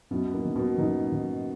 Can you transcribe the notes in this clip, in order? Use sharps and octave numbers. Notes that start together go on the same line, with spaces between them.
F#2 B2 B3
A#3
D#3
B2 B3
F#2 D#3 D#4
D#3